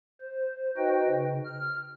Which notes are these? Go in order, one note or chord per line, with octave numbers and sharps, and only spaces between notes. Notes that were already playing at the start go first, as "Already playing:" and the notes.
C5
D#4 F#4 B4 C5 D#5 G5
C#3
F6